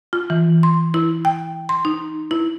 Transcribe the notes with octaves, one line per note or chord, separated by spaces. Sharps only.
F4
E3
C6
E4
G5
C6
D#4
E4